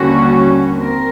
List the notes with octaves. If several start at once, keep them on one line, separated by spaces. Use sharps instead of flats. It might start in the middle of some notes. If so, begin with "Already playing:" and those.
Already playing: D#2 D3 G3 A#3 C#4 F#4
C4 A#4